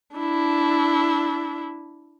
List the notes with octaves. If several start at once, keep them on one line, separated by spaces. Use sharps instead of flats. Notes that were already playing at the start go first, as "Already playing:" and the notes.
D4 E4